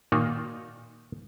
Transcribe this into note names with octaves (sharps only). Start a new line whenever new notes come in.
A#2 D#3 A#3 D#4 F4 F#4